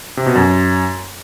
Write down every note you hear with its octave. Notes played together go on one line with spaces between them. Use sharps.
C3
B2
F#2